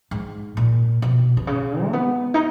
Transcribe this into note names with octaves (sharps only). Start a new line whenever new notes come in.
G#2
A#2
B2
B2
C#3
A#3
B3
D#4